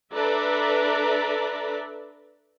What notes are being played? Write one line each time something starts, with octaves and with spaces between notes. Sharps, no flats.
D4 A4 B4 D5 E5 A#5